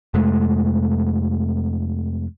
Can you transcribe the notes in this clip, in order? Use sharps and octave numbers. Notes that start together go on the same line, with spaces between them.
F2 C3 G#3 A3